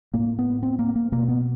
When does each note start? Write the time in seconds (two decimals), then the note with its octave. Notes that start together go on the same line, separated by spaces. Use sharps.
0.14 A2 A#3
0.39 B3
0.63 C4
0.79 A#3
0.95 A#3
1.12 B2 A#3
1.28 B3